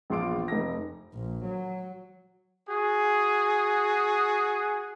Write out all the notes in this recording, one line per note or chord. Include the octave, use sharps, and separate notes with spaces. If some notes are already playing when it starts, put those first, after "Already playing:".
A#1 E2 F4 C6 D6 D7
F1 A3 A#6
A#1
F#3
F#4 G#4